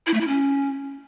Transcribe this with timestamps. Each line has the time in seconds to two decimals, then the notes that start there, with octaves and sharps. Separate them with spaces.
0.07 E4
0.14 A3
0.21 E4
0.28 C#4